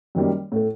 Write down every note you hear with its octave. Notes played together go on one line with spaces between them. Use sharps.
F#2 D#3 G3 A#3
A2 A3